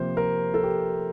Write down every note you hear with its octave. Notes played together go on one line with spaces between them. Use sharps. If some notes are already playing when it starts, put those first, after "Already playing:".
Already playing: C3 F3 A#3 F4 C5
A#4
A4
G4